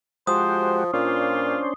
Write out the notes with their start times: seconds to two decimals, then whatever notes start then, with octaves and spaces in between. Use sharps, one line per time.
0.27 F3 G#3 F#4 G4 C5 D#6
0.94 A#2 C#4 D4 F4 C5